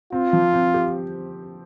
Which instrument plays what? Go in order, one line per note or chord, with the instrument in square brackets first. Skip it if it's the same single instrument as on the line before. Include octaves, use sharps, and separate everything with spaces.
[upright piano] C4 [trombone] F4
[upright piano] F3
C4
G4